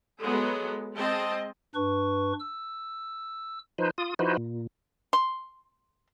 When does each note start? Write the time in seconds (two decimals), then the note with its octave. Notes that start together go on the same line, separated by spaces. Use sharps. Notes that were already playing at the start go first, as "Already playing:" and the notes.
0.20 F#3 G#3 B3 A4
0.95 G#3 C4 D#5 A5
1.75 G2 D4 B4 C#6
2.40 E6
3.78 F3 D#4 B4 C5
3.98 F4 D#6
4.19 F3 D#4 E4 F#4 B4 C5
4.37 A#2
5.13 C6